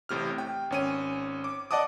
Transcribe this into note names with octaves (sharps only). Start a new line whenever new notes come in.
A1 A2 C3 F6
G5
G#1 C#4 D#7
D6
D5 D#5 F#5 A5 D6 D#6